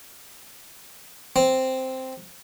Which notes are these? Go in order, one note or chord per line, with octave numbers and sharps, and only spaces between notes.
C4